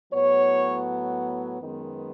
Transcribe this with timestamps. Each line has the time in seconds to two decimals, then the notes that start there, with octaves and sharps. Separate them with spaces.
0.12 A2 F#3 B3 C#5
1.60 F#2 D#3 G#3 B3